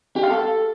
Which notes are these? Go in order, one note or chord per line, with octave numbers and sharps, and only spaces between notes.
G4
F5
A4